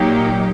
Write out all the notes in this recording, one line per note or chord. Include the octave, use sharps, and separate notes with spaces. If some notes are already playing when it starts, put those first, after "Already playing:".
Already playing: A#2 F#3 A#3 D#4 G4